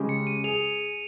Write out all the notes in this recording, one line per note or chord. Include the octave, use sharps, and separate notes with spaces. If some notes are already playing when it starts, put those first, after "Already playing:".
Already playing: C#3 G#3 C#4 G4
C#7
D#7
G#4 F7